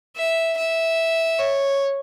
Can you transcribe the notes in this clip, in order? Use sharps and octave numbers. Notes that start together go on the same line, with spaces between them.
E5
E5
C#5